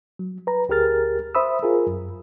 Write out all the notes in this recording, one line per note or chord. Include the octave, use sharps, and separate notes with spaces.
F#3
B4 A#5
D2 G4 G#4 A#4 F6 A6
C5 E5 B5 D#6 E6
F4 G#4 A#4
F#2